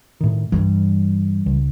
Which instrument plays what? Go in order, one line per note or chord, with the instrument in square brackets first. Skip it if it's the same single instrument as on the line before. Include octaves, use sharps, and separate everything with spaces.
[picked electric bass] A2 D#3
[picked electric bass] G2 [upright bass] E3 G3
[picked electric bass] C#2